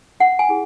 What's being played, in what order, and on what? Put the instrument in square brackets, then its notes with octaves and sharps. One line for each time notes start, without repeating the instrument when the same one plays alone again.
[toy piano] C#4 F#5
G#5
E4 G#4